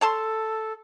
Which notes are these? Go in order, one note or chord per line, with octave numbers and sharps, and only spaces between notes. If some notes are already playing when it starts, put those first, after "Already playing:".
A4 C#5 A5 C6